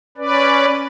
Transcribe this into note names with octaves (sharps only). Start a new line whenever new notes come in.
C#4 B4 D5